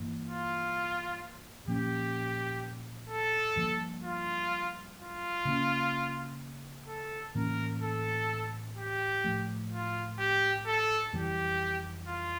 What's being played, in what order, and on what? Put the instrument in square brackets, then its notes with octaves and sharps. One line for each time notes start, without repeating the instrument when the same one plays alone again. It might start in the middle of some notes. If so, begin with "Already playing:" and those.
Already playing: [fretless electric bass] G2 E3 A#3
[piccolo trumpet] F4
[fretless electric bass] A#2 F3 A#3 C#4 [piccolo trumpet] G4
[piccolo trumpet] A4
[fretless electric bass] G2 F3 A#3
[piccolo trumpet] F4
F4
[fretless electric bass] C#3 G3 A#3 C#4
[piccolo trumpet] A4
[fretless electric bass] A2 E3 A#3 C#4 [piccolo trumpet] A#4
[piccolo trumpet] A4
G4
[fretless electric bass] A2 F3 A3
[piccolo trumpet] F4
G4
A4
[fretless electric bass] F2 E3 G3 [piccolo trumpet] G4
[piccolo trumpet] F4